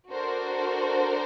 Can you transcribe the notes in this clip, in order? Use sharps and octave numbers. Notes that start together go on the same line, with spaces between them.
D4 F#4 A4 A#4 C5